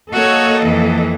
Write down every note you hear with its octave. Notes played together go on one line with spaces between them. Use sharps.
A#3 F#4 A4 C#5 D#5
F2 E3